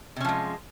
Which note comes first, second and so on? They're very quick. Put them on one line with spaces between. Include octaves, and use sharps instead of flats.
C3 C#4 F3 G#3